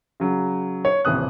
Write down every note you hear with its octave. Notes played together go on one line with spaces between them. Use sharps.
C#3 F#3
C#5
D#1 A1 C3 D#6 F#6